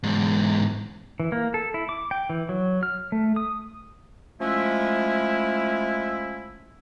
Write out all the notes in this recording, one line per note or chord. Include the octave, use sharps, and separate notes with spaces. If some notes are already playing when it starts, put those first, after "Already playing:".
E2 G#2
E3
A#3
A4
E4
D6
G5
E3
F#3
F6
A3
D#6
F3 G#3 A3 C#4 E4